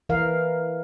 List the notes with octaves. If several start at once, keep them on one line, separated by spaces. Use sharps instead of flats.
E3 A#4 F5